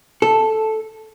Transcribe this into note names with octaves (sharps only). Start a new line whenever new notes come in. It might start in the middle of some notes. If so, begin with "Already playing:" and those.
A4